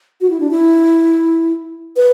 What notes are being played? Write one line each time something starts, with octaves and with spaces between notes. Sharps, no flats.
F#4
E4
D4
E4
B4